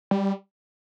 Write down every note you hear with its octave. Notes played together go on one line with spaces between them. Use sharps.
G3